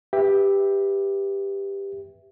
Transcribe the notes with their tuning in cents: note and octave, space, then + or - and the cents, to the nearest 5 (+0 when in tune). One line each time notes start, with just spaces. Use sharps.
G4 +10 B4 +0 E5 +0